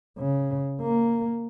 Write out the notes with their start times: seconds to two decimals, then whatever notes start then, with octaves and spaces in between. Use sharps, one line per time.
0.18 C#3
0.81 A#3